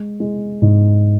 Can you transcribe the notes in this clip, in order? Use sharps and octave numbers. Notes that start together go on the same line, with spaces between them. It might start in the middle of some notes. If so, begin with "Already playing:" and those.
Already playing: G#3
G#3
G#2